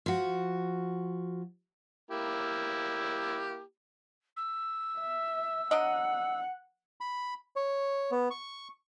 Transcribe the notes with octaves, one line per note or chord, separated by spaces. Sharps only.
F3 F#4
A#3 E4 G4
E6
E5
F#3 D4 D#5 F#5
B5
C#5
B3
C#6